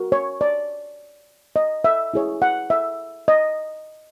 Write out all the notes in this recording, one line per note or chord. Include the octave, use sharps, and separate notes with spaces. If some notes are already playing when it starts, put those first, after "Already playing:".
Already playing: F#4 A#4
C#5
D5
D#5
E5
E4 G#4 C#5
F#5
E5
D#5